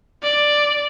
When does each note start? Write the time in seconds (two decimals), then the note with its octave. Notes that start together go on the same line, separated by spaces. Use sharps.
0.23 D5